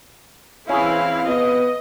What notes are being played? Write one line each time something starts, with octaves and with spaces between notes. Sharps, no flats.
E3 C4 C#4 E4 G#4 F5
B3 D#5